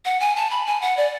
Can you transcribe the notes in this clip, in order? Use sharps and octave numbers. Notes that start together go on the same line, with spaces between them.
F#5
G#5
A5
B5
G#5
F#5
D5